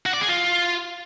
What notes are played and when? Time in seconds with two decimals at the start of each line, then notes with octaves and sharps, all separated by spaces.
0.06 F#4
0.13 D5
0.21 G#4
0.29 F4